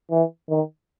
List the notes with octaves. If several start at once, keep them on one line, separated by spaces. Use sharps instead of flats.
E3
D#3